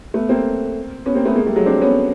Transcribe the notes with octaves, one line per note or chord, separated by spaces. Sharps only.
A3 B3
A#3 C4
B3 C#4
A#3 C4
A3 B3
G#3 A#3
G3 A3
F#3 G#3
C4 D4
B3 C#4